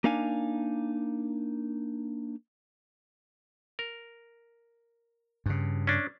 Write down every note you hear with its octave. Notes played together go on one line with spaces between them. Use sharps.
A#3 D4 D#4 F5 G#5
A#4
G2 C#3
C#4 D4